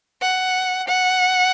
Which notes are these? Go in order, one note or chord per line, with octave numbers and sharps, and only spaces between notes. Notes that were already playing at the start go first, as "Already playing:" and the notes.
F#5
F#5